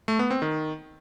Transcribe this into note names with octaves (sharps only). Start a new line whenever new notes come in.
A3
B3
C4
D#3